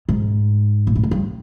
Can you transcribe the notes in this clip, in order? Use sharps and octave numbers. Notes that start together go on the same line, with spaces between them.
G#2
A#2
A2
G#2
G2